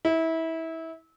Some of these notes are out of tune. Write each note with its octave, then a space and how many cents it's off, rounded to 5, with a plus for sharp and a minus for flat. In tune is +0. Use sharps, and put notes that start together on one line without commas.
E4 -25